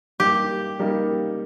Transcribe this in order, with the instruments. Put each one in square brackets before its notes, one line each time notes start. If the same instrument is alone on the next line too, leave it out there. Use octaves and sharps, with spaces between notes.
[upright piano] G2 G3 A#3 D#4 [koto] G4
[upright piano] G3 A#3 D#4